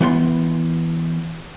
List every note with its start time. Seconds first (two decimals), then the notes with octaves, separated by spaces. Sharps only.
0.01 E3 B3 F#5 C6